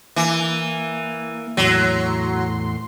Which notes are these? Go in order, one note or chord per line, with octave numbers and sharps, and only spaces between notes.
E3 A#3
E2 A2 F#3 C6